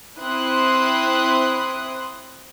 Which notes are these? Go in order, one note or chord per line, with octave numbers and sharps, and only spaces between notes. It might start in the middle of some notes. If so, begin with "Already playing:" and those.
C4 E4 C6 D#6 F#6